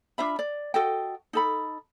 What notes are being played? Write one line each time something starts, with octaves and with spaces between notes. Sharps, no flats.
D4 F4 E5 B5
D5
F#4 A4 D#5 G5
D#4 A4 B5